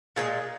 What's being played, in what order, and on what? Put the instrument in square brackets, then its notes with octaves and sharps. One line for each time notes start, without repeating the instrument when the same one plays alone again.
[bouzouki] A#2 F3 G#3 G#4